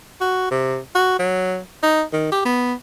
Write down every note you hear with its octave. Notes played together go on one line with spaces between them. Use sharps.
F#4
C3
F#4
F#3
D#4
D#3
G4
B3